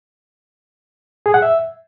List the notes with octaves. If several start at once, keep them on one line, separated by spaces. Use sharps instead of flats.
G#4
F#5
E5